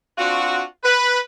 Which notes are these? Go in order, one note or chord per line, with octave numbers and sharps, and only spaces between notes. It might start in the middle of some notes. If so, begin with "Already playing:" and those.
C4 D4 F4 F#4
B4